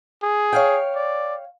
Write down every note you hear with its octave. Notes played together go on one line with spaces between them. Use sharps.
G#4
C#5 F5 G5
D5